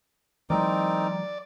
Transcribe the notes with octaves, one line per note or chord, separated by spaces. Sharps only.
E3 F#3 G#3 C4 D#4 A#4 D5